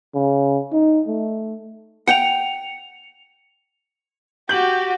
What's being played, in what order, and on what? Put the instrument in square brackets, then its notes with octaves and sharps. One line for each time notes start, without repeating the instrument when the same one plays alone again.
[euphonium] C#3
D#4
A3
[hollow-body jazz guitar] F#5 G5 [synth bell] C#7 F7
[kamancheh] F#4 G4 [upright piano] G6 F#7